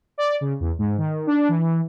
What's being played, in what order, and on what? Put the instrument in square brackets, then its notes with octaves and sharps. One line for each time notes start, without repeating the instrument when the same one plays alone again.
[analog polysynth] D5
C#3
E2
G#2
D#3
D4
E3